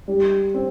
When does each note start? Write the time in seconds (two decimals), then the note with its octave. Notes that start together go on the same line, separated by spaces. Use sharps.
0.08 G3
0.54 C4